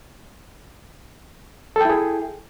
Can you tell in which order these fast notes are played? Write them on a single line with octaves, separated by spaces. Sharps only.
A4 G5 E4 G#4